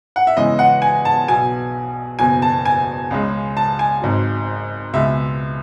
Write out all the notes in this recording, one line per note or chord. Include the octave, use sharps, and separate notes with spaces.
F#5
E5
E2 C#3 E3 G#3 D#5
F#5
G#5
A5
B1 B2 F#3 G#5
F#1 E2 B2 F#3 G#5
A5
G#5
C#2 C#3 G#3
A5
G#5
G#1 G#2 F#3
C#2 B2 G#3 E5